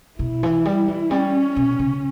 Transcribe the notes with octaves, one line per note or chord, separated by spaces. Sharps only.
B2 E4
E3
G3
E3
G3 C#4
B2
C#3